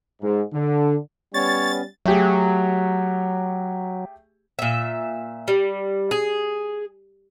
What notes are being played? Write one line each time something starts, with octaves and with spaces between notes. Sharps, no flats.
G#2
D3
G3 B3 C#4 C#5 A6
F#3 A3 G4 G#4
A#2 E5
G3
G#4